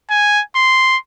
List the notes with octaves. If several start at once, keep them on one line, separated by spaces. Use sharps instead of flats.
G#5
C6